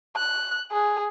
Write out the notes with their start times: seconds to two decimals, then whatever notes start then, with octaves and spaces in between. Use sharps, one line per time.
0.16 F#6
0.72 G#4